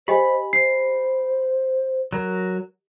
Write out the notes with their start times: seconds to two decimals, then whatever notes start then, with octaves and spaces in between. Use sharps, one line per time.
0.08 G4 C5 D#5 G#5 B5
0.53 C5 C7
2.13 F#3 A#4